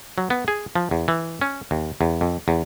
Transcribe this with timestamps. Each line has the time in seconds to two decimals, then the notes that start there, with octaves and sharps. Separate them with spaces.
0.18 F#3
0.30 B3
0.48 G#4
0.76 F3
0.91 E2
1.08 E3
1.41 C#4
1.71 D#2
2.01 E2
2.21 F2
2.48 E2